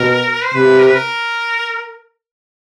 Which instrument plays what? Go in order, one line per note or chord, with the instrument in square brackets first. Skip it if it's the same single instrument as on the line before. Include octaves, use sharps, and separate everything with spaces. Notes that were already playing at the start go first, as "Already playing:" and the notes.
Already playing: [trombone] B2 [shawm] A#4
[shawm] C5
[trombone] C3 [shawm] B4
[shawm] A#4
B4
A#4